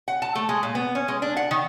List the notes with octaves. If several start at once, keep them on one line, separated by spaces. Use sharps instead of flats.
F#5
A5
A3
G#3
A#2
B3
C#4
G#3
D4
F#5
D#3